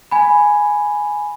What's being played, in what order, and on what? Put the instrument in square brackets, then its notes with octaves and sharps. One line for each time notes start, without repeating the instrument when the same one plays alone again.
[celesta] G#5 B5